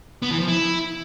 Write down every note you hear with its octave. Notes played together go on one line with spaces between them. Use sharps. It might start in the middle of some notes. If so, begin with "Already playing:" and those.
B3
E3
F3
E4